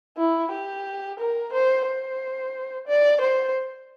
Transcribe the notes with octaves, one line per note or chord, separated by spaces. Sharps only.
E4
G4
A#4
C5
C5
D5
C5